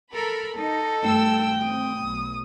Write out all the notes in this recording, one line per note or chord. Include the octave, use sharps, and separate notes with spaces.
A4 A#4 B5
D#4 A4
G2 A3 G5 E6
C4 D#6
B1